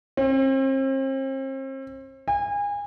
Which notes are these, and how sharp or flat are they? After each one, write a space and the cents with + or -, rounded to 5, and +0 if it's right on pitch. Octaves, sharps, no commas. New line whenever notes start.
C4 +40
G#5 -30